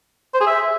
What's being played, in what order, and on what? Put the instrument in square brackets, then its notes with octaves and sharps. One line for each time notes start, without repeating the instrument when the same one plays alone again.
[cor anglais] C5
G#4
E5